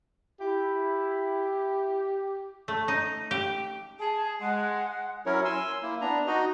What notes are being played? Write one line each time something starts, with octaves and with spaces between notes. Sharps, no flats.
E4 G4
A3
D#4
G4
G#4 A5
G#3 F#5
F#3 C#4 E4 A#4 C#5
G#5 C6 E6
A#3 E4
B3 D4 A#5
D#4 F#4 D#5